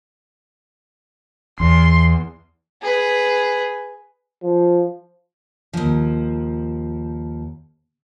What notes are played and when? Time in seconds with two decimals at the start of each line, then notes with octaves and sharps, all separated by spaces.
1.60 E2 C6
2.82 G#4 B4
4.43 F3
5.73 D#2 F3